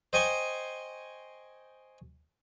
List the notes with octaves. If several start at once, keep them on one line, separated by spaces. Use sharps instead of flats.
C5 D#5 G5 G#5 C6 C#6